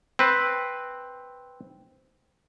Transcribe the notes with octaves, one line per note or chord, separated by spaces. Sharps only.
C4 B4